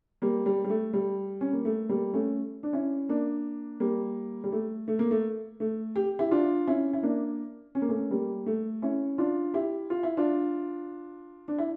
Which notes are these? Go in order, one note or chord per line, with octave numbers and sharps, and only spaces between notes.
G3 A#3
G3
G3
A3
G3
C#4
A#3
A3
G3 A#3
A3 C#4
D4
C#4 E4
A#3 D4
G3 A#3
G3
A3
A3
A#3
A3
A3
G4
E4 G4
D4 F4
C#4 E4
E4
A#3 D4
C#4
A#3
A3 C#4
G3 A#3
A3
C#4 E4
D4 F4
E4 G4
F4
E4
D4 F4
D4
E4